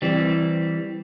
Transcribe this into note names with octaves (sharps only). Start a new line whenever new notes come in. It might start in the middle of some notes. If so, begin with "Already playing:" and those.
E3 G3 C4